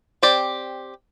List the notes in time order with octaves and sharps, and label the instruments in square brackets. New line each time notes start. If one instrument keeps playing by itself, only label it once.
[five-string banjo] C4 G4 D5